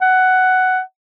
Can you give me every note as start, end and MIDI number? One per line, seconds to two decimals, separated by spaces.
0.02 0.80 78